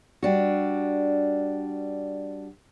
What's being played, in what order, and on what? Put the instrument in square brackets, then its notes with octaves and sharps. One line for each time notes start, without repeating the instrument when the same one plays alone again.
[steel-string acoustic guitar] G3 D4 F#4